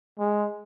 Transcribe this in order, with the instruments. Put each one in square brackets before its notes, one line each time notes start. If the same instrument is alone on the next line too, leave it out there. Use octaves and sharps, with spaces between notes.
[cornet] G#3